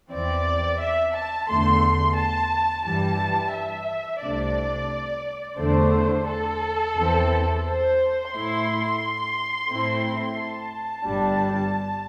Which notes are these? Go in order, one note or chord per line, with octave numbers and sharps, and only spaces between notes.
E2 E3 C4 D5
E5
A5
E2 D3 A3 C6
A5
G2 E3 G3 A5
E5
C2 C3 A3 D4 D5
E2 D3 A3 D4 C5
A4
E2 E3 C4
C5
A2 A3 E4 C6
A2 A3 C4 E4
A5
G1 G2 G3 D4